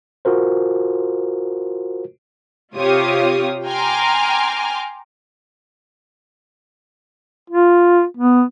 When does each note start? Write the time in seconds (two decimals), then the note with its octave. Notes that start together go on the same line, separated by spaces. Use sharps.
0.25 F4 F#4 A#4 C5
2.74 C3 F4 G4 C#5 F5 D#6
3.67 G5 G#5 A#5 C6 D6 F6
7.50 F4
8.17 B3